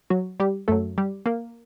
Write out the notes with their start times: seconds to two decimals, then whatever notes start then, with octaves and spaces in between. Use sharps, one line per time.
0.10 F#3 F#4
0.40 G3 G4
0.68 F#2 F#3 A3 A4
0.98 G3 G4
1.26 A#3 A#4